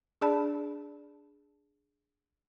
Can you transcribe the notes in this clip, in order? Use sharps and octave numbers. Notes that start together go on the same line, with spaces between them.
D4 G#4 D5 A5 B5